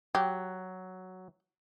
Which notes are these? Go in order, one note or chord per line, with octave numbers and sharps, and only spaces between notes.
F#3 G4